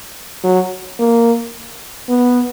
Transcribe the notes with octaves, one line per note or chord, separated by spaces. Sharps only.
F#3
A#3
B3